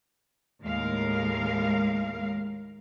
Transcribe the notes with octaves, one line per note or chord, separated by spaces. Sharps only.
D#2 A2 G#3 A#4 F5